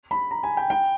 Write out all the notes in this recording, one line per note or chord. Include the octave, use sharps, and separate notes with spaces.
B5
A#5
G#5
G5
G5